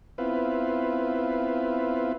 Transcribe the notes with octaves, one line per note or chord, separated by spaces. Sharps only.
B3 C4 E4 F4 B4